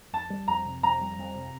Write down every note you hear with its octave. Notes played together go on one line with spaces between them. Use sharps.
F2 A5
G3
F2 A#5
C3
F2 A#5
G3
F2
C3